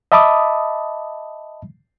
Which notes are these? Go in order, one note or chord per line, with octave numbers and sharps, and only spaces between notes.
D#5 E5 A5 B5 D6 D#6